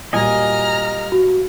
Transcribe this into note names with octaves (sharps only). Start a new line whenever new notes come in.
A#2 F#3 G3 D#5 G#5 A#5 F6
F#4